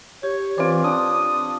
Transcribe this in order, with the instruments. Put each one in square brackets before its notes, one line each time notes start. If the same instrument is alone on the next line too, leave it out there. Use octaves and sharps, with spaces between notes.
[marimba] G4 [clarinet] C#5
[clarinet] E3 [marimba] C4 C5 [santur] F4 D5
[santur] D4 [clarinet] D#6